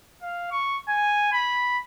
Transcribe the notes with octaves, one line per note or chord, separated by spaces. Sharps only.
F5
C#6
G#5
B5